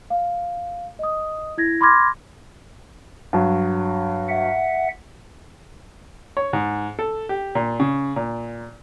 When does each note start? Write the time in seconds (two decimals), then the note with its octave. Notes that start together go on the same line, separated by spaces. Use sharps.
0.10 F5
0.99 D#5 D#6
1.58 E4 G#6 A#6
1.81 B5 C6 D6 F6 G#6 A#6
3.33 G2 F#3
4.28 E5 F#5
6.37 C#5
6.53 G#2
6.99 A4
7.29 G4
7.55 A#2
7.80 C#3
8.16 A#2